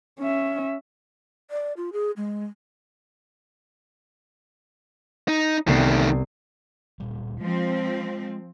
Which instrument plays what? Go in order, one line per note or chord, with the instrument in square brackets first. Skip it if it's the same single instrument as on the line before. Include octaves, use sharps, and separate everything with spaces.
[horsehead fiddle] C#4 E5
[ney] D5
F4
G#4
G#3
[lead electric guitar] D#4
[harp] C2 B3 C7 [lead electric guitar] D#3 A3
[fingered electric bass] D1 A#2 G3
[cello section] F3 C4 [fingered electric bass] G#3